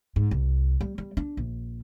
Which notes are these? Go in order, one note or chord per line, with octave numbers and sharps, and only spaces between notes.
G#2
C2
G3
G3
D4
A#1